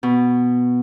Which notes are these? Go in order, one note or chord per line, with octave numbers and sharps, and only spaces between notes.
B2